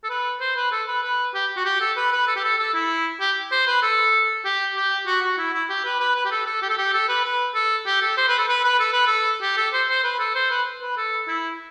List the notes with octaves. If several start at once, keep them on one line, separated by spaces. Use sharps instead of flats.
A4
B4
C5
B4
A4
B4
B4
G4
F#4
G4
A4
B4
B4
A4
G4
A4
A4
E4
G4
C5
B4
A4
G4
G4
F#4
F#4
E4
E4
G4
B4
B4
B4
G4
A4
A4
G4
A4
G4
A4
B4
B4
A4
G4
A4
C5
B4
A4
B4
B4
A4
B4
A4
G4
A4
C5
C5
B4
A4
C5
B4
B4
A4
E4